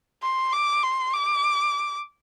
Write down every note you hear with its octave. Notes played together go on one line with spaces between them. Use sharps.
C6
D6
C6
D6